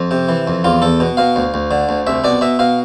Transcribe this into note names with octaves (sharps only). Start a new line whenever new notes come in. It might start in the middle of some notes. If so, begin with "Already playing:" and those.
Already playing: F2
C3
E3
F2
E2 F4
E2 A4
B2
B2 F5
D2
D2
D3
D2
C2 E5
B2 D5
B2 E5
B2 F5